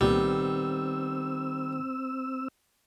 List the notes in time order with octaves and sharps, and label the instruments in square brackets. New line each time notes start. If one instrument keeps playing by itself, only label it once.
[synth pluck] C2 A#2 [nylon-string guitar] D#3 A3 B3 [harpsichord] G3 [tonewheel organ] C4 E6